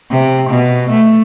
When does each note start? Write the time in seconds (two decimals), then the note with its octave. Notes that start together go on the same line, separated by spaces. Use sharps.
0.11 C3
0.49 B2
0.90 A3